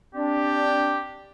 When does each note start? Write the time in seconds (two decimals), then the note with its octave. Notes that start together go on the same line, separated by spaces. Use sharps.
0.15 C4 D4 G4 D5